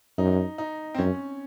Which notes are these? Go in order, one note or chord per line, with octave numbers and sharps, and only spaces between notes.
F#2 D#4
D#4
C4
F#2 C#4